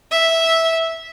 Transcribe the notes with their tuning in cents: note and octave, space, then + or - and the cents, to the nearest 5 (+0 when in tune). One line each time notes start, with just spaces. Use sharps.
E5 -10